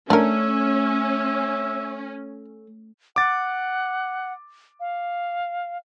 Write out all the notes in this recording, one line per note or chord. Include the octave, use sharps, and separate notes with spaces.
A3 C#4 D4 A#4 E5
F#5 D6 A6
F5